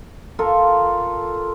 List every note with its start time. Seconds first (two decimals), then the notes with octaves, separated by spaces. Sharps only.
0.39 F4 A4 A#4